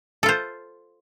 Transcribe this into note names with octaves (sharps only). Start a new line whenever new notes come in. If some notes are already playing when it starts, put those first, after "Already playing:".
F4 A4 C5